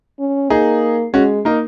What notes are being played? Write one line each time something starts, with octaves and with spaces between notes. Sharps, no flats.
C#4
A#3 D#4 G#4
G#3 C#4 F#4
A#3 D#4